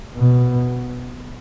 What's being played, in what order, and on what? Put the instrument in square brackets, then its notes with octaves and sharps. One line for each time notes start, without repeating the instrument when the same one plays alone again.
[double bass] B2